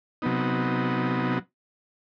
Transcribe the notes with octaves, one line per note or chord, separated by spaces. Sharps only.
C3 F#3 B3 D#4